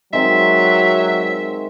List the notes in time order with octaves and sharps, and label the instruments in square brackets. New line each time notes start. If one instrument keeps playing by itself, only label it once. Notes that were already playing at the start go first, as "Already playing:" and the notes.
[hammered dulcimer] D#3 G#3 C4 [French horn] F#3 [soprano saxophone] E5